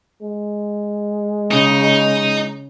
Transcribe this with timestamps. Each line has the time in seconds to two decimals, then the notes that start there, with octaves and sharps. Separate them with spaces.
0.22 G#3
1.51 C#3 D#4